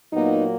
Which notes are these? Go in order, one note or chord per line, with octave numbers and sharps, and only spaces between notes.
A#2 F#3 A#3 B3 D#4